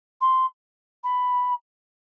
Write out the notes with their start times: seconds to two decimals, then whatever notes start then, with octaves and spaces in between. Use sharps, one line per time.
0.21 C6
1.04 B5